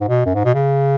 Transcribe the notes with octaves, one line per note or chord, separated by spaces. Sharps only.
G#2
B2
F#2
G#2
B2
C#3